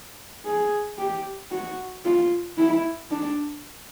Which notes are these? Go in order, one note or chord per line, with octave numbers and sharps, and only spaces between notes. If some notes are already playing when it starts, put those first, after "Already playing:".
G#4
G4
F#4
F4
E4
D4